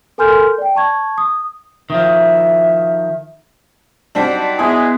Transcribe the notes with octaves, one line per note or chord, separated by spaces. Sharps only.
A4 A#4 G#5 C6 F6 G6
D5 G5
A5 C#6 G#6
D#6
D#3 F3 E5
G3 C4 D4 D#4 F#4 D5
G#3 B3 E4 G#4